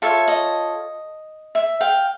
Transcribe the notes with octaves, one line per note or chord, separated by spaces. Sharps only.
F4 A4 C#5 E5
D#5
E5
F5 G5